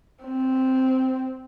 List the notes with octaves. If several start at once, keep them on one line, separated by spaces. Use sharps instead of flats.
C4